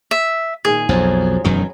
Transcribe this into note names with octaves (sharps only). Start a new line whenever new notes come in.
E5
A#2 D#3 G#4
B1 F2 F3 F#3
E1 F#2 B2 D#3 F#3 C#4